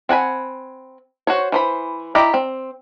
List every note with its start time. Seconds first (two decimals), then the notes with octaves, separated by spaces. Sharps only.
0.09 C4 F#5 G#5 B5
1.27 F#4 C5 C#5
1.52 E3 C5 B5
2.15 E4 G4 D5 D#5 A#5
2.34 C4